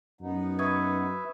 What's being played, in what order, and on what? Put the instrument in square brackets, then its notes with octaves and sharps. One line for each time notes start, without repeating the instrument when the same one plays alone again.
[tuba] F#2 [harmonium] B3 D#4
[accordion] B4 E5 [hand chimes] C#6 D#6 G#6